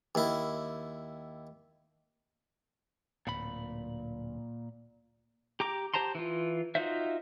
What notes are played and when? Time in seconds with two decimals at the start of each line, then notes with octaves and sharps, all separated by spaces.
0.15 D#2 E4
3.27 D1 A#2 B5
5.60 G4 A#5 D6
5.94 G4 C5 A5 A#5 C6
6.15 E3 F4
6.75 D#4 F4 F#4 C5 E5